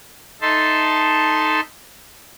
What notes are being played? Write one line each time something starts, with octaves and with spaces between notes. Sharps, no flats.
D#4 A4 E5 A5 C6